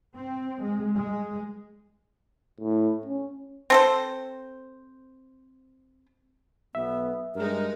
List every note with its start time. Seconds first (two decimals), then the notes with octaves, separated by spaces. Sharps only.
0.16 C4
0.62 G#3
0.95 G#3
2.61 A2
3.06 C#4
3.70 C4 A4 C5
6.75 B1 B3 E5
7.35 G2 G#3 D#4 A#4